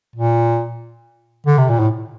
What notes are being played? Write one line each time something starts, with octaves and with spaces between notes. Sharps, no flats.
A#2
D3
C3
A#2
A2